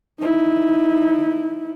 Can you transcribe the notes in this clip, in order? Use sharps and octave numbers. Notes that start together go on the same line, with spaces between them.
D#4 E4